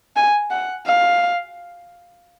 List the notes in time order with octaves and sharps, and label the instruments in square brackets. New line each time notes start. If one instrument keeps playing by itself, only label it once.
[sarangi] G#5
F#5
F5